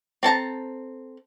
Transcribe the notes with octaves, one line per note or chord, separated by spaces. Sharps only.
C4 A4 A5 A#5